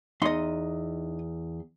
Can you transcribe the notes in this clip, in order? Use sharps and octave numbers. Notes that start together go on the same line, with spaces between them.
E2 D#4 D#5 C6